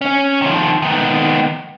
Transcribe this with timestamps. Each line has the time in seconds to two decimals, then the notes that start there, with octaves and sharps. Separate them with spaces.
0.01 C#4
0.42 D#3 F3
0.82 D#3 B3